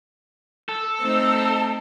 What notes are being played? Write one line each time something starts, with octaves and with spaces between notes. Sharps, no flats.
A4
A3 C4 D#4